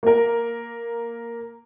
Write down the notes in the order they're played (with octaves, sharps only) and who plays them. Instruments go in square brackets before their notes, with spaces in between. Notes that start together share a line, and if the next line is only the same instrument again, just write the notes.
[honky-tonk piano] A#3 A#4